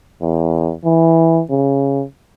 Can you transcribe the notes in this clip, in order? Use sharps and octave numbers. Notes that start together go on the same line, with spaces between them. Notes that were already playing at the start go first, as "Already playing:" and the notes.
E2
E3
C#3